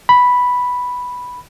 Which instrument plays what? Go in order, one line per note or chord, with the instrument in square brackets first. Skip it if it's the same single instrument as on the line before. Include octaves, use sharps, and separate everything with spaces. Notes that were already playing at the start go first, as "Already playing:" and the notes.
[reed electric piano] B5